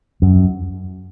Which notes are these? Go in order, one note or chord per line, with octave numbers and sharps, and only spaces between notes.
F#2